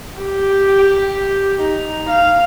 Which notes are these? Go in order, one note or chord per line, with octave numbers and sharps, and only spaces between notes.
G4
D#4
F5